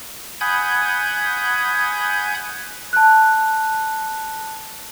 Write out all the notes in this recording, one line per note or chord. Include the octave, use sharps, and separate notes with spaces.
F#5 G#5 B5 D#6 G6 G#6
A5 F#6